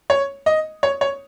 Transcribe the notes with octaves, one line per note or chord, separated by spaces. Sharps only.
C#5
D#5
C#5
C#5